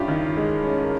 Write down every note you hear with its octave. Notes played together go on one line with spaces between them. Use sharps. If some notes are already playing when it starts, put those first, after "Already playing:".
Already playing: G2 C#4 E4 F4 G4
D#3
G#3
C#4
A#4